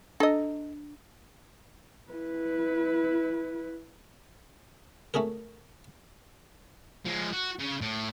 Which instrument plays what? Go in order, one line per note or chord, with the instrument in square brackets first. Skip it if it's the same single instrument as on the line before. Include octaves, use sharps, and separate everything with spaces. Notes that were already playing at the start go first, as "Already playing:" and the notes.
[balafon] D4 [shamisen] A4 D#5
[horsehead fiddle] E4 B4
[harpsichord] A3 C#4 F#4 G#4 A#4
[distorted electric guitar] F3 G#3
F#4
C#3
A2